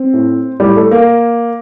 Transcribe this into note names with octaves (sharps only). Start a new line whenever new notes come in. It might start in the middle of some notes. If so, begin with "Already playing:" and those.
Already playing: C4
A2
A2 G3
A3
A#3